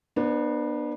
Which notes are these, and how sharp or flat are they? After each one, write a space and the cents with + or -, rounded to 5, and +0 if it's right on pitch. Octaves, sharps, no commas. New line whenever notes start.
B3 -30 D4 +30 C5 +0